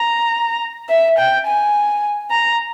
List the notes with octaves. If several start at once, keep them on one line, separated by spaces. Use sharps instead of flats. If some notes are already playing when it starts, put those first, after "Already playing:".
Already playing: A#5
E5
G5
G#5
A#5